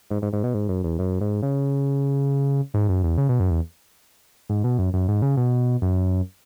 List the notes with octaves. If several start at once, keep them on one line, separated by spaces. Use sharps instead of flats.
G#2
G#2
G#2
B2
G#2
F#2
E2
F#2
G#2
C#3
G#2
F#2
E2
C#3
B2
F#2
E2
G#2
B2
F#2
F#2
G#2
C#3
B2
F#2